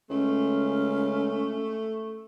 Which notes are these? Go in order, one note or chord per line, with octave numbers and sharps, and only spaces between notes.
C#2 A3 C#4